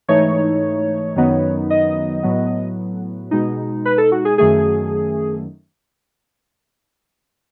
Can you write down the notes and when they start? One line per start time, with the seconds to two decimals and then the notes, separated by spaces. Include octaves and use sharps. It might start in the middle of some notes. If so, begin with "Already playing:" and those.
0.08 G#2 E3 A3 D#4 C#5
1.16 F#2 D#3 F#3 B3 D#4
1.70 D#5
2.23 A2 F#3 B3
3.31 B2 G#3 D#4
3.85 B4
3.98 A4
4.12 F#4
4.25 G#4
4.38 F#2 D#3 A3 G#4